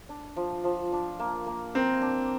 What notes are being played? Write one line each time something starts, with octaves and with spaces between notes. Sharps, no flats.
D4
F3
F3
D4
A#3
A#3
C4 A#4
D4